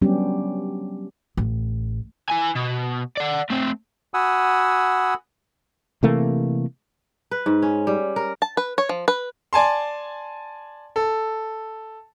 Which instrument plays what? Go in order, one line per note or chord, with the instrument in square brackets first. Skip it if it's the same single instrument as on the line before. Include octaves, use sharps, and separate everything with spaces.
[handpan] F#3 G3 B3 C#4 D4 G4
[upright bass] A1
[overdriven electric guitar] E4 G#5
B2
D5 F#5
A3 C4
[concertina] F#4 F#5 G#5 B5 D#6 E6
[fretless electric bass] C3 E3 A3 A#3
[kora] B4
G#2
C#4
G3
A#4
[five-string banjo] A5
B4
C#5
F3
B4
[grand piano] D5 G#5 A5 C6
A4